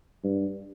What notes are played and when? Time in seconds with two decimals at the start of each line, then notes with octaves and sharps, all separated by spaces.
0.24 G2